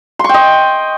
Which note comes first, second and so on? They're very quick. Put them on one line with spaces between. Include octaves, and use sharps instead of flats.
C6 C#6 G5 D#5